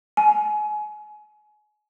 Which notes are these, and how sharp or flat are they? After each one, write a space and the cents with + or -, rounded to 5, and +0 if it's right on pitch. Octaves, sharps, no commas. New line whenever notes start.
G#5 +30